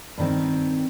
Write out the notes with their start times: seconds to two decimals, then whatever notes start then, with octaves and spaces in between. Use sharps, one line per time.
0.18 G2 D#3 C4